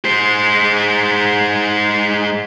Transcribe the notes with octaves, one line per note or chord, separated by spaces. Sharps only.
G#3 C5